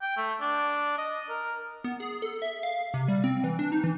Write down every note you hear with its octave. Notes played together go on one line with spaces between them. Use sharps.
G5
A3
D4
D#5
A#4
B3
G#4
A4
E5
F5
C3
G3
C4
E3
D4
D#4
E3